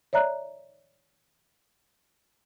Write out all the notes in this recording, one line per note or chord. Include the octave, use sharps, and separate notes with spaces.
C#5 D5 E5 A#5 F#6